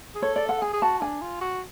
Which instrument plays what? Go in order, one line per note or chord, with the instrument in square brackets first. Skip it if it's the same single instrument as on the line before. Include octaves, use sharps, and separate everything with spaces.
[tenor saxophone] G#4
[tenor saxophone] A4 [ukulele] C#5
[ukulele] D5
F#5
[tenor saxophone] G#4 [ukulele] G#5
[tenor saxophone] G#4
[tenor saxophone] F#4 [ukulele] A5
[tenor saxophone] D4 [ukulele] G#5
[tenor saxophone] F4
F#4